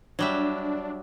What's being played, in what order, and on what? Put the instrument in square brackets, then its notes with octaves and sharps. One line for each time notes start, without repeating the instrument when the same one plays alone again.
[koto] F#3 G3 E5 [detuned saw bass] D4